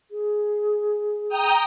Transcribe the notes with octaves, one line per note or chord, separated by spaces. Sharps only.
G#4
G5 A#5 D#6